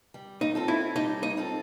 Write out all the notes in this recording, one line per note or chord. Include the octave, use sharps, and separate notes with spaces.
G3
D#4
C4 F4 A4
E4
G3 D#4
D#4
C4 F4 A4